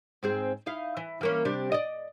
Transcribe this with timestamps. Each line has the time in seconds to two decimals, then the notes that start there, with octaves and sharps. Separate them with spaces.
0.23 G#2 C4 G#4
0.66 D#4 E4 F5
0.97 E3
1.21 E3 A#3 C#4
1.45 C3 G3 D4
1.72 D5 D#5